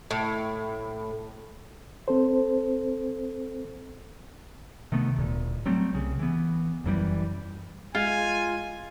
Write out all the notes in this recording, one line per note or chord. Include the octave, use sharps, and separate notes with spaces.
A2
C4 A4 C5
C3 D#3 A3 B3
D1 A#2
F#3 G3 A3 C4
C2 C#3
E3 B3
F#1 F#2 E3 G3
G#3 F4 G#5